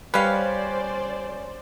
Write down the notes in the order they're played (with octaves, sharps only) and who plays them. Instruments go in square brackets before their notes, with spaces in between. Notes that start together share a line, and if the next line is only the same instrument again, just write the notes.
[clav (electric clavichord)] G3 B4 [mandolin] C#4 F5 [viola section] C5 D5